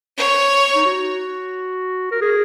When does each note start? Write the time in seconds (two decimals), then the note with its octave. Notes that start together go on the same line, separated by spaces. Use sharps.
0.17 C#5
0.75 D#4
0.86 F#4
2.11 A#4
2.22 G#4